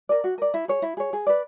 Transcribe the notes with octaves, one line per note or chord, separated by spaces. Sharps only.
A#4 D5
F#4
A#4 D5
E4
G#4 C#5
E4
G#4 C#5
G#4
B4 D5